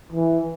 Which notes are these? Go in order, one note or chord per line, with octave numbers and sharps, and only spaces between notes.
E3